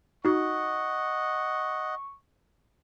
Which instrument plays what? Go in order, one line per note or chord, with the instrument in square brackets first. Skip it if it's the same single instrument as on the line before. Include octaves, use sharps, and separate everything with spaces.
[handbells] D#4 F#4 [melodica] D#5 F#5 [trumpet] C#6